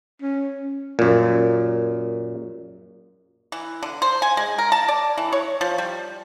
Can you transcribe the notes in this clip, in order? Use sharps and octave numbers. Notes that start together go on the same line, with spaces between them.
C#4
F#2 A#2
E3
D3
C5
G#5
G#3
A#4
A5
D5
E3
C#5
F3
G3